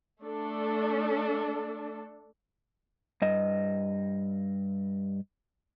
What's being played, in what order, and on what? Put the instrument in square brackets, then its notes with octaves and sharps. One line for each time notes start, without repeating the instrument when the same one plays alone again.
[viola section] A3 D4 A4
[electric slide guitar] G2 D#5